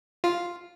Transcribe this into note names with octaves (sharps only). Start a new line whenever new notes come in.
F4